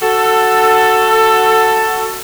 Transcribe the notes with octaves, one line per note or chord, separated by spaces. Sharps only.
F#4 A4